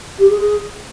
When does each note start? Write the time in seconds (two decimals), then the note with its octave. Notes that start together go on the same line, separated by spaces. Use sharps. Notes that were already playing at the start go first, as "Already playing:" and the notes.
0.19 G4
0.30 G#4
0.40 G#4